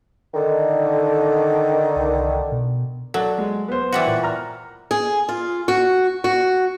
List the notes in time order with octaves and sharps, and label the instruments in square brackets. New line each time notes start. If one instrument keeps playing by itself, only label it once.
[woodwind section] D3 D#3
[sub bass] C2
B2
[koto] F#3 [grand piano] A4 D5
[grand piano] G#3
B3 C5
[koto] E3 G3 F#4
[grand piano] A#2
A#5 F6
[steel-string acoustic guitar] G#4
F4
F#4
F#4